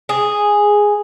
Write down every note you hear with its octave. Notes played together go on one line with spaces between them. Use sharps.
G#4